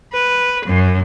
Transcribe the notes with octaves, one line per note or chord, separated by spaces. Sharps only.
B4
F#2